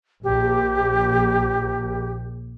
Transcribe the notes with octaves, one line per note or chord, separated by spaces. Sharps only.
A#1 G4